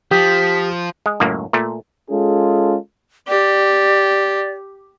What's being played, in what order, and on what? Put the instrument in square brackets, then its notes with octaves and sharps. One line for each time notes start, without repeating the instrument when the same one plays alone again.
[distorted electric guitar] F3 [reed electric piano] G4 D#6 G6 [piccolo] B6
[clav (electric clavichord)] G#3
C#2 F#2 A2 A#3
A#2 A3
[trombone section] G#3 C#4 F4 G#4 A4
[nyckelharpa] G4 [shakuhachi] D5